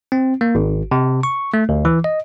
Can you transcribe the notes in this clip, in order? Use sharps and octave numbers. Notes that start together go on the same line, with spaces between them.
C4
A#3
G#1
C3
C#6
A3
D2
E3
D#5